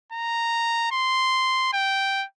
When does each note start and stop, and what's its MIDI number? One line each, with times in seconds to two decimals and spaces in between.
0.12 0.90 82
0.92 1.69 84
1.73 2.25 79